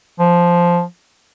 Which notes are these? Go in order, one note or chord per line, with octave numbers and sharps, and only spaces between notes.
F3